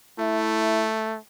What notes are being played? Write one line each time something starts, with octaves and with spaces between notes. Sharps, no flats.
A3 E4